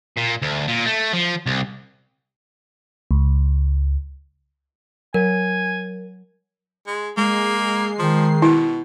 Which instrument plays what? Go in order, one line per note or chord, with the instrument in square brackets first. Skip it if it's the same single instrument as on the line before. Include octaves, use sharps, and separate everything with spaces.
[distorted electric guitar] A#2
D2
A#2
A3
F3
C2
[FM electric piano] C#2
[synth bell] F#3 [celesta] A#4 [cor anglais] G#5
[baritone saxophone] G#3
[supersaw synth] G#3 C7 [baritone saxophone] A#3
[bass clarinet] D#3 [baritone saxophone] F3
[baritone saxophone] B2 [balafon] E4